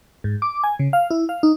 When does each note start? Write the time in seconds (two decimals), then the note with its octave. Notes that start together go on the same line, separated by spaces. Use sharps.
0.24 G#2
0.42 D6
0.64 G#5
0.79 C#3
0.93 F5
1.10 E4
1.29 F5
1.43 D#4